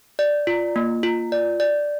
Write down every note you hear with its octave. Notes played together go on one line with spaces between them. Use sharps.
D5
F4
A#3
F4
D5
D5